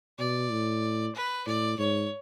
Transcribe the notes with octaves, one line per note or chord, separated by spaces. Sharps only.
B2 D5
A2
B4
A2 D5
G#2 C#5